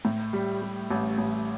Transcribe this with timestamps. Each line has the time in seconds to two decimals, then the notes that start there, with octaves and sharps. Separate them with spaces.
0.05 A2
0.33 G3
0.62 G3
0.90 A1
1.18 A1